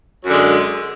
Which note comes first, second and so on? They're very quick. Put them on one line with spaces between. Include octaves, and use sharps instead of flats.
F#3 F#2 D3 G#3